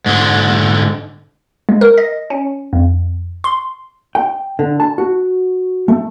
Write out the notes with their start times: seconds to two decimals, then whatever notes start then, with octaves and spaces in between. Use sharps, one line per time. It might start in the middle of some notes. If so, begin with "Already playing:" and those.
0.06 G#2 D3
1.69 G#3
1.81 A#4
1.98 D#5
2.30 C#4
2.73 F2
3.44 C6
4.15 G5
4.59 D3
4.80 A5
4.98 F#4
5.88 A3